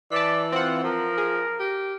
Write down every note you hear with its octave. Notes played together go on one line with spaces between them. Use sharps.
E3 D5 A5 B6
C4 F4 F#5
F3 A#4
G#4
G4